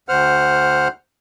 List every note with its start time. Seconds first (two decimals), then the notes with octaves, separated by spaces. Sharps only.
0.09 D2 C5 F#5 F6